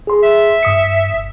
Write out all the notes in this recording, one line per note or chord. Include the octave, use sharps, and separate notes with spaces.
G#4 C6
E5
G2 D#6 C#7
G1